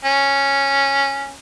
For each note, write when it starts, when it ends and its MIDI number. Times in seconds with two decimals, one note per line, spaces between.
0.05 1.36 61